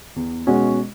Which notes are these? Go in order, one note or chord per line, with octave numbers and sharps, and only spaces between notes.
E2
B2 G#3 C#4 F#4